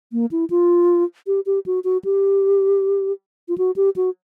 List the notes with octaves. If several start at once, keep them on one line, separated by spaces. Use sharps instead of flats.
A#3
E4
F4
G4
G4
F#4
F#4
G4
F4
F#4
G4
F#4